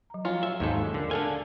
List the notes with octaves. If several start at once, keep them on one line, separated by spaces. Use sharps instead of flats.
F#3 A#5
F3 F#3 F4 G#5
E5
D#2 G#2 A4
D3 A#4
D3 A4 A#4 F5 G#5